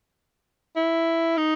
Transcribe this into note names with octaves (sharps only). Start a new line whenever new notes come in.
E4
D#4